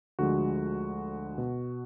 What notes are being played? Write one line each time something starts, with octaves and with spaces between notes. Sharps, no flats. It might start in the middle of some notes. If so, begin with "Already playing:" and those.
D2 D3 F3 G#3 F#4
B2